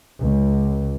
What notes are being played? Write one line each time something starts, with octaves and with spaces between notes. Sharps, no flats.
C#2